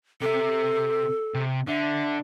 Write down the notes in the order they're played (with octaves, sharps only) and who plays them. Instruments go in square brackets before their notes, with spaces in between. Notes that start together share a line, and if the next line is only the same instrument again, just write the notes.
[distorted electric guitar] C3 E5 [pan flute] A4
[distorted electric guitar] C3
[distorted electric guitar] D3 [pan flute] E5